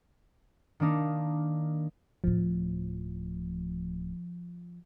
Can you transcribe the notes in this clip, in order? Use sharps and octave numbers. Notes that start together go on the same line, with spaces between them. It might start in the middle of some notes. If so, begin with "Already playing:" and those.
D#3 A#3 D4 D#4
D1 A2 F3